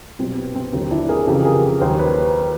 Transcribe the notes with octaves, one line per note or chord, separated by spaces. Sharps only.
C2 B2 F#3 C4
B3
C4
D#2 D3 F#3 C4
D4 E4
G#4 A#4
F2 C#3 E3 G4 A4
G#4 A#4
D#2 D#3 F#3 A#4 C5
B4 C#5